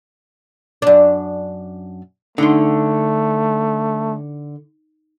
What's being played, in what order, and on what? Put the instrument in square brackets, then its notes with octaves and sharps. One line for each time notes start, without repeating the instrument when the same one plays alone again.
[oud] F#2 D4
[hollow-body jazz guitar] D3 F#5 C6 [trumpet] A3 [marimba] D#4